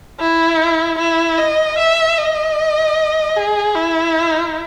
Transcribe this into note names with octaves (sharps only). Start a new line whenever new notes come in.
E4
E4
D#5
E5
D#5
G#4
E4